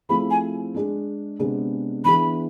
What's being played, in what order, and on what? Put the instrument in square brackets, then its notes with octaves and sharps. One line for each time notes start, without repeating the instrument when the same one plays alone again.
[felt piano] F3 A3 C4 E4 G#4 [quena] B5
[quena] G#5
[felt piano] G#3 D4 G#4
C3 G#3 B3 D4 G#4
[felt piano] E3 B3 D4 G#4 [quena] B5